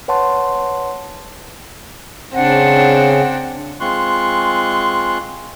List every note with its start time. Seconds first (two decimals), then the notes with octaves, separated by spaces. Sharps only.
0.08 B4 C#5 F#5 A5 C6
2.35 C#3 C4 D4 F#5
3.80 G#3 C4 F4 C6 C#6 F#6